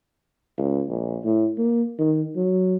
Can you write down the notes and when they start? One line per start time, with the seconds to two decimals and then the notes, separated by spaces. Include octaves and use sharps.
0.58 C#2
0.89 A#1
1.24 A2
1.58 A#3
1.99 D#3
2.36 F#3